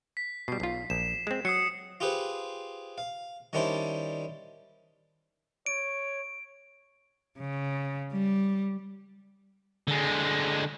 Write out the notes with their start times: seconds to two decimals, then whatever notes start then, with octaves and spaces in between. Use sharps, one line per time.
0.17 B6
0.48 B2 G3 C7
0.60 B1 F4
0.90 A#1 E7
1.27 G#3 C4
1.45 F#3 D#6 C7 C#7
2.00 F4 G4 G#4 B4 C5
2.98 F5
3.53 D#3 G3 C#4 D4 E4 C5
5.66 C#5 D7
7.39 C#3
8.13 G3
9.88 D3 G#3